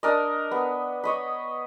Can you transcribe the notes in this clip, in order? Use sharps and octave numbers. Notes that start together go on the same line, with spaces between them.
D4 A#4 D#5
B3
C#5 D#5 B5